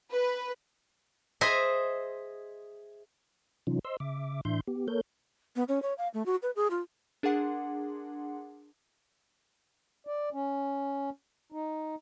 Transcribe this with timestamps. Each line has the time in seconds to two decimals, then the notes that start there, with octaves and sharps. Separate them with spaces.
0.10 B4
1.41 G#4 C5 D#5 E5
3.67 C3 E3 F#3 C#4 D#4 F4
3.85 C5 D#5 C6 E6
4.00 C#3 E5 D6
4.45 A2 E3 D4 E5 C6 G6
4.67 B3 G4
4.88 A#3 A4 A#4 C#5 G6
5.56 B3
5.68 C#4
5.82 C#5
5.98 F5
6.14 A3
6.26 F#4
6.42 B4
6.56 G#4
6.70 F4
7.23 D4 G#4 A#4 F#5 C6
10.07 D5
10.33 C#4
11.52 D#4